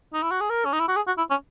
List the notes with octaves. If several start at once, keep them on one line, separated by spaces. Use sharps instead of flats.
D#4
E4
F#4
G#4
A#4
C#4
D#4
E4
F#4
G#4
F#4
E4
C#4